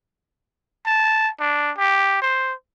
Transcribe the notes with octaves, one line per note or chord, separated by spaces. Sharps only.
A5
D4
G4
C5